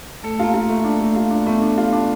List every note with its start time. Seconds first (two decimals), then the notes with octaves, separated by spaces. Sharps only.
0.23 A3 A4
0.39 A#3 F4
0.54 F4
0.69 A3
0.84 D4
1.00 A3
1.16 F4
1.31 D4
1.46 A3 B3
1.62 D4
1.78 F4
1.93 D4